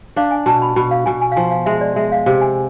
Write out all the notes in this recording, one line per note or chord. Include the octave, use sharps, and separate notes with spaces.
D4 F5
G#5
B2 A5
B5
B2 B5
F5
B2 G#5
G#5
F5
F3 G#5
F5
G#3 E5
D5
G#3 E5
F5
C3 F5
G#5